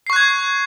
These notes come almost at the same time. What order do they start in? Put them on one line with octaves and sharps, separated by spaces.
C7 C#6 F#6 G#6